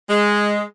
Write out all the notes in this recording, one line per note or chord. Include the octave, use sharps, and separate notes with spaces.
G#3